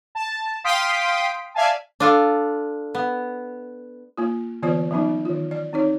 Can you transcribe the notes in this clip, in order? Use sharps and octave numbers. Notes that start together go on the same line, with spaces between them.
A5
F5 G5 C6 D#6 B6 D7
D5 E5 F5 G#5 A5
D4 F4 A4
B3
A#3 F4
D3 E3 B3 F4 C5 D5
F3 F#3 B3 C#4 D#4
D#3 F4
D5
C4 D#4 C#5